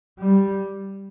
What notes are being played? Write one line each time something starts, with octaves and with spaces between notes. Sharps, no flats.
G3